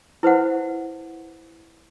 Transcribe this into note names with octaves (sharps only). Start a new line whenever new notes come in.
E4 B4 C5 F#5